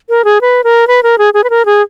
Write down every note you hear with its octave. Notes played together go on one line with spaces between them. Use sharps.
A#4
G#4
B4
A#4
B4
A#4
G#4
G#4
B4
A#4
G#4